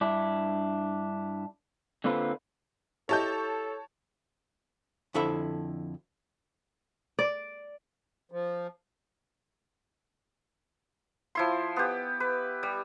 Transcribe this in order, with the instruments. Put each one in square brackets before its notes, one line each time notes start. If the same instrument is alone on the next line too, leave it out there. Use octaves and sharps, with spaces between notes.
[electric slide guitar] G2 D4 E4
D3 A#3 C4 F4 B4 C5
[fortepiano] E4 G4 D#5 [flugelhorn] A4 [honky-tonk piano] C#5 A5 G6
[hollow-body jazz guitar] F2 D3 E4 A4 E5 B5
[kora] D5
[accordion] F3
[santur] F3 E4 C6
B3 G4
B4
G3